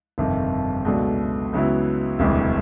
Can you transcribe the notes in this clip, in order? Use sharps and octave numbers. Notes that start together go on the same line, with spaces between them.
G1 F2 C3 D#3
C#2 B2 F#3 A3 D4
C#2 C#3 F#3 B3 E4
E1 D2 C3 E3 G3